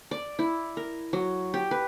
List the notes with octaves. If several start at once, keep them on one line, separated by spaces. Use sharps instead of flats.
D5
E4
A#4
F#3
G4
B4